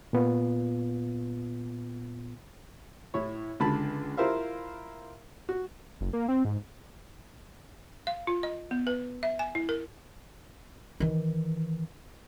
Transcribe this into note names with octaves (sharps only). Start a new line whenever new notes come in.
A#2 B3 F4
A2 E4 C#5
C#2 D3 A5 B5
E4 F4 A#4 C5 E5 F5
F#4
F#1
A#3
C4
G#2
F5
F4
D#5
B3
B4
E5
G#5
E4
A#4
D#3 E3